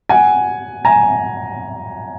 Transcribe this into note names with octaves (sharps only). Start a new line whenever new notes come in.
F#5 G#5
G#5 A#5